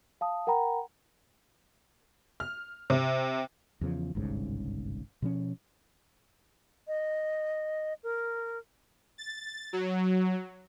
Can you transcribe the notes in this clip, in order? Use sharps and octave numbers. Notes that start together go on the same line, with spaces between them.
F5 A5 D#6
A#4 F#5 G5 A#5 B5
F6
C3
E2 C#3 F3
G1 C2 G#2 C#3
B2 F3 C#4
D#5
A#4
A6
F#3